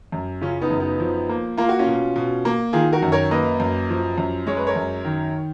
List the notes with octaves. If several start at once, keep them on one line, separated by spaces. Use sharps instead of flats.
F#2
C#3 C#4 F4
B3 D#4
F#2
B3 D#4
F3
A#3
A#3 F4
F#4
C#4 F4
B2
B2
A#3
D#3 F4 G#4
F#4 A#4
F#2
A#4 C#5
A#3 B4 D#5
F#2
F3
F#2
G#3 C#5
B4
A#4 C#5
F#2
D#3